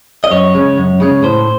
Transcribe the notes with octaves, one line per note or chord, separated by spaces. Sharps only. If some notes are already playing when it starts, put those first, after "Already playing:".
D#5
F#2 C#5
C#3 G#3 C#4
F#2
C#3 G#3 C#4
A2 C5